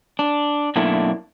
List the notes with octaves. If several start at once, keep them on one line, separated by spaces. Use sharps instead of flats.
D4
F#2 B2 A3 A#3 D4 E4